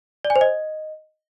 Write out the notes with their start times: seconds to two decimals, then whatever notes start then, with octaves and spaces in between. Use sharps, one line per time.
0.25 D5
0.30 G#5
0.36 C5
0.41 D#5